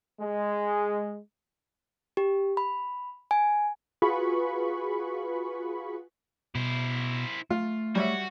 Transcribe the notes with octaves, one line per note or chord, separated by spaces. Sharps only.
G#3
G4
B5
G#5
F4 F#4 G#4 B4 B5 C#6
B2 E4 C5
A3 F4
G3 F#4 C#5 E5